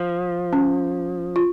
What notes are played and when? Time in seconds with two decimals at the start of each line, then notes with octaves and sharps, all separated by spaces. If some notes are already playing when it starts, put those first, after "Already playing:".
Already playing: F3
0.53 C#4
1.36 F4